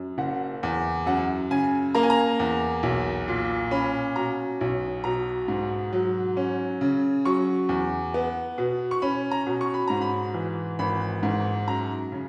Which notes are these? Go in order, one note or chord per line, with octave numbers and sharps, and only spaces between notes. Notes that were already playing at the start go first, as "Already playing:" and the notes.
Already playing: F#2
F#1 F#5
E2
F#2 F#5
C#3 G#5
A#3 A#5
G#5
A#5
E2
B1
A#2
C#4 B5
B2 A#5
B1
B2 A#5
G#2
F#3
C#4
C#3
F#3 C#6
E2
B3
B2
C#6
C#4 B5
A#5
B2
C#6
B5
G#2 A#5
B5
E3
G#1 B5
G#2
F#2 A#5
C#3